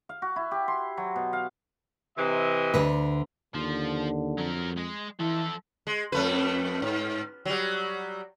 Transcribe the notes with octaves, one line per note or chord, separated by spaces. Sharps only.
F5
F#4
E4
G4
C6
F#3
B2
F5
C3 E3 D#5
D2 D3 B4
D#2 D3 F3
F2 F#3 A#4
G#3
E3 F3 E4 A4
G#3
F2 A3 B4
G#2
F#3 G3